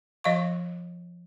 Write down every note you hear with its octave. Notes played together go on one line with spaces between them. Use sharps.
F3 D#5 F5 C#6